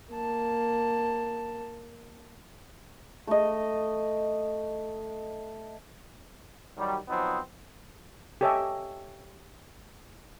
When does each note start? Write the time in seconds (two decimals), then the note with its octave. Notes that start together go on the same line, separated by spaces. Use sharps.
0.12 A#3 A5
3.27 A3 D#5
6.77 D#3 F#3 G3
7.08 F3 F#3 B3 C4 D#4
8.41 G4 A4 C#5 D#5 E5 G#5